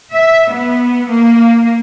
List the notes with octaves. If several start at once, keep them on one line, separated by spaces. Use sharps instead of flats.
E5
B3
A#3